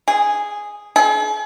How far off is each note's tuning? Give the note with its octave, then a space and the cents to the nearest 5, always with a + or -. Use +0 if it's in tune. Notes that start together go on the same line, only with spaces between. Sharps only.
G#4 -5
G#4 +45